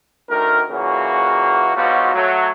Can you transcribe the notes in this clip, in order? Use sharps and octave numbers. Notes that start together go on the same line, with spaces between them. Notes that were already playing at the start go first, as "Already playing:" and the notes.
D2 D#3 A#4
A#2 C#3 E3 A#3 F#4
G#2 B2 F#3 G3 F4 F#4
F#3 A3